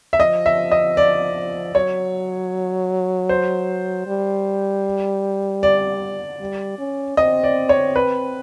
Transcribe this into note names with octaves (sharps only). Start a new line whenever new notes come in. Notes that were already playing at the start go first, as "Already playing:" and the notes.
E5
F3 D#5
E5
D#5
D5
F#3 C#5
C5
G3
D5
G3
C#4
C4 D#5
D5
C#5
B4